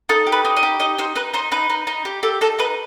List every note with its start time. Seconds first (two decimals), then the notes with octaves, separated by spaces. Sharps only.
0.09 D#4 A4
0.27 G4
0.32 B4
0.45 D#4
0.57 D#5
0.63 G4
0.80 D#4 D#5
0.98 D#4 C5
1.15 D#4 B4
1.34 D#4 C5
1.52 D#4 B4
1.70 D#4
1.87 D#4
2.05 G4
2.23 G4 A4
2.41 D#4 A4
2.59 D#4 B4